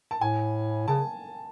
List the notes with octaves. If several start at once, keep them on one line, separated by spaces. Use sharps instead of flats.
A5
A2 G#5
C#3 A5